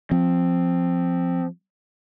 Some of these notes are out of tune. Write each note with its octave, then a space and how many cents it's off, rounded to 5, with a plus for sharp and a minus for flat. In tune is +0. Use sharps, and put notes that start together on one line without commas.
F3 +0 C4 +0